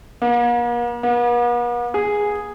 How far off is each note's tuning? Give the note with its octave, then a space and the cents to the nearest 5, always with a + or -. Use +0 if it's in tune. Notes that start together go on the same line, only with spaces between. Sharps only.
A#3 +45
B3 -45
G#4 -5